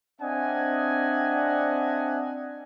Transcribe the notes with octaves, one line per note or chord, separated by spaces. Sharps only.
C4 D4 D#5 E5 F#5 G#5